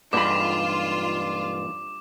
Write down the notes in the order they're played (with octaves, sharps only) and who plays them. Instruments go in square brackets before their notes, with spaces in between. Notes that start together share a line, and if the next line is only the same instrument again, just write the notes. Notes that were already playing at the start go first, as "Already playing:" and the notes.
[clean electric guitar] B1 E2 B5 [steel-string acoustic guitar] G2 [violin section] F4 [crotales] D6